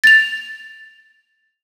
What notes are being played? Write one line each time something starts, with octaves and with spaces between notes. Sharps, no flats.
A6 F7